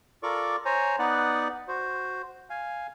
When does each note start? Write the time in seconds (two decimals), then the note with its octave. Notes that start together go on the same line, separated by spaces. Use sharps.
0.23 F4 A4 A#4 D5 C#6 D6
0.65 C5 C#5 G#5 A#5
0.99 B3 D#4 B4 D5 F#5
1.68 F#4 C5
2.50 F5 G#5